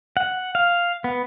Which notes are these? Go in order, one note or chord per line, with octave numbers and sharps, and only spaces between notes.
F#5
F5
B3